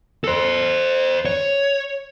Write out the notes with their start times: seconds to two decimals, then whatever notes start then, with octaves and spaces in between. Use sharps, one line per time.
0.24 A4 C5
1.26 C#5